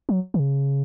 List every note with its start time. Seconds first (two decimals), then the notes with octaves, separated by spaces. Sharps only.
0.09 F#3
0.34 D#3
0.40 C#3